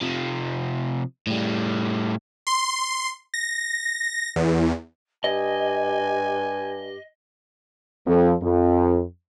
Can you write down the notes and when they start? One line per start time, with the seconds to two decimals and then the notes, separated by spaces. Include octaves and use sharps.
0.01 C3 F3
1.27 A2 G3
2.47 C6
3.34 A#6
4.36 E2
5.24 G2 G4 D#5 G#5
8.06 F2
8.42 F2